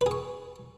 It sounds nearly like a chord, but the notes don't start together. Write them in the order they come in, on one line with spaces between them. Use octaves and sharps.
B4 G#4 C#6